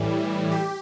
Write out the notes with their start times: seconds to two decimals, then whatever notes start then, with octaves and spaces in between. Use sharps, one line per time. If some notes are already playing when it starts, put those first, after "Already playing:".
Already playing: A2 E3 G3
0.51 G4